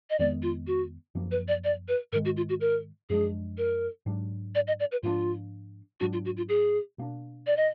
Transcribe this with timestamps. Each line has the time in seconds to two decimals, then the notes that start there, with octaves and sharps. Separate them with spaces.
0.10 D#5
0.19 F2 D#3 G#3 B3 D5
0.42 F4
0.67 F#4
1.15 F#2 F3 A#3
1.31 B4
1.48 D5
1.64 D5
1.88 B4
2.12 G#2 D#3 G#3 A#4
2.25 F#4
2.37 F4
2.49 F#4
2.61 A#4
3.10 F#2 F3 G#3 D4 G#4
3.58 A#4
4.06 G#2 F#3 D4
4.55 D5
4.68 D#5
4.80 D5
4.92 B4
5.03 G#2 F3 A#3 D4 F4
6.00 G#2 F#3 D4 F#4
6.13 F4
6.25 F#4
6.37 F4
6.49 G#4
6.98 B2 A#3 D4
7.47 D5
7.57 D#5